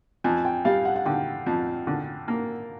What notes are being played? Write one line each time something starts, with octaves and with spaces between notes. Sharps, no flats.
F2 G#5
G5
G3 F5
F#5
F#5
D3 G5
F2
D3
A#3